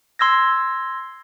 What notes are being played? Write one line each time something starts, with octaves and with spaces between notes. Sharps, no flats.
C6 E6 G#6 A#6